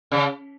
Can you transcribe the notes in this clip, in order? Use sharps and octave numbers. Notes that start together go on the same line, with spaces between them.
C#3